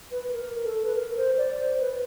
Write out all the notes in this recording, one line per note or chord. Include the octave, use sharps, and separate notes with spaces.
B4
B4
A#4
A4
B4
A#4
C5
D5
C5
B4